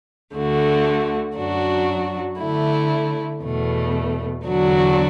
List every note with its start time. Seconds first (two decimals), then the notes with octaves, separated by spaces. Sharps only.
0.34 D2 D3 A3 F#4
1.36 F#2 F#3 D4 F#4
2.39 D3 A3 E4
3.42 E2 B2 A3
4.44 E2 D3 F#3 D4 F#4